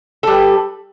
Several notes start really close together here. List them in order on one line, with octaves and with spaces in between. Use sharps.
A4 G3 B4